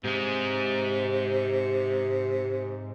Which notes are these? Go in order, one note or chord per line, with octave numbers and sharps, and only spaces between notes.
G#2 C3 G#3